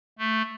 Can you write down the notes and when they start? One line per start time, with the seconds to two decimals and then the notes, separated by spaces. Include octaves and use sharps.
0.19 A3